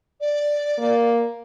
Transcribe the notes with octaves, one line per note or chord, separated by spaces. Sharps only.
D5
A#3